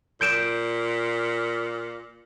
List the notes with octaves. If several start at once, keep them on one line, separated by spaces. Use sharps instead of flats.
A#2 G6 D7 E7